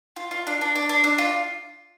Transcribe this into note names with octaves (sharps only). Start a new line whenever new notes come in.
F4
F4
D4
D4
D4
D4
D4
F4